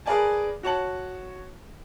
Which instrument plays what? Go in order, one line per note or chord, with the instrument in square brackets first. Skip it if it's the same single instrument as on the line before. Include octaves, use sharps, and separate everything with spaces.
[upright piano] G#4 A#4 B4 D5 G#5 A5
F#4 C#5 A5 F#7